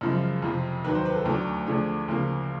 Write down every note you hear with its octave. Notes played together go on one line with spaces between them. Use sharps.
F#2 C#3 F3 G#3
F2 C3 F3
D#2 D#3 F#3 B4
C5
B4
A4
D2 D3 F#3 A3
D2 D3 F3 G#4
D2 C#3 F3 A#3